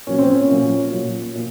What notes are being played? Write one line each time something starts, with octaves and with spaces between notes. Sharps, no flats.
A#2 F#3 C#4
C4
C#4
A#2 F#3
A#2 F#3
A#2